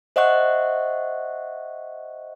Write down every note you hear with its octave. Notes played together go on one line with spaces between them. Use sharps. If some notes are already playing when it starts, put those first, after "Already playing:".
C5 D#5 E5 F#5 C#6 F#6